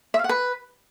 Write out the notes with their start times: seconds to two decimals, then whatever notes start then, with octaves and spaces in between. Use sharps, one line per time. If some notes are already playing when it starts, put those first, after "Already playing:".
0.14 E5
0.19 F5
0.24 F#5
0.29 B4